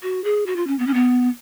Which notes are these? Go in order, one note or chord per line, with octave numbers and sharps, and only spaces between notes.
F#4
G#4
F#4
F4
C#4
B3
C#4
B3